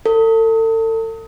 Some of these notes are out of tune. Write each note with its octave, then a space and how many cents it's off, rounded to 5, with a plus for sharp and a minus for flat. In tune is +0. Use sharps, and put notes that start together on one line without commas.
A4 +35